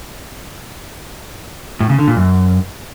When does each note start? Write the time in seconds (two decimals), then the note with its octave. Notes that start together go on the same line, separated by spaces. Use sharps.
1.80 A2
1.90 C#3
1.99 D3
2.08 A#2
2.17 F#2